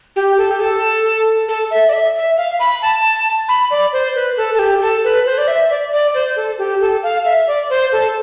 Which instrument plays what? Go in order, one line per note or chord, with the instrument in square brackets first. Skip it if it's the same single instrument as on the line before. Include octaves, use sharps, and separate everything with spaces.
[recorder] G4
A4
G4
A4
A4
E5
D5
E5
E5
F5
B5
A5
B5
D5
C5
B4
A4
A4
G4
A4
B4
C5
D5
E5
D5
D5
C5
A4
G4
A4
F5
E5
D5
C5
A4